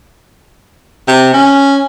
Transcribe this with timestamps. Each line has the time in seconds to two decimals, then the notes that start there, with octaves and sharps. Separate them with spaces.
1.08 C3
1.34 C#4